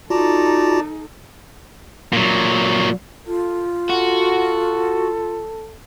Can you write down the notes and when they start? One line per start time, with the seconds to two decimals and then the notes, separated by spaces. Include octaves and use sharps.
0.10 D#4 F4 F#4 A4 D5 A5 A#5
2.13 A#2 F#3
3.27 F4 A4
3.89 F#4 A4